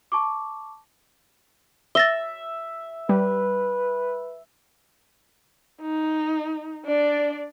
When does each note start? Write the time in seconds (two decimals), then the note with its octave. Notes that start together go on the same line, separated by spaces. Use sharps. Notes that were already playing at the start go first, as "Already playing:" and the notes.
0.12 A5 C#6 D6
1.95 E5 A6 A#6 G7
3.09 G3 B4
5.82 D#4
6.86 D4 D5